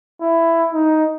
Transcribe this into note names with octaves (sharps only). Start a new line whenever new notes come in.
E4
D#4